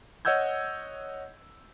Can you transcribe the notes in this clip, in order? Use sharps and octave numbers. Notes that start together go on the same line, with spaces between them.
C#5 D#5 F#5 E6 G6 G#6